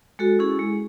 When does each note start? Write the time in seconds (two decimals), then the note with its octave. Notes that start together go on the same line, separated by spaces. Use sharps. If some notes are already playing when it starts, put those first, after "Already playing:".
0.19 G#3 F#4 A4
0.39 C#4 E4 G#4
0.59 G#3